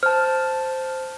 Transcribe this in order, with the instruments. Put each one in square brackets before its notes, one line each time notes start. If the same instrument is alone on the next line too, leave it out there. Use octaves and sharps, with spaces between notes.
[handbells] C5 A5 [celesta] F6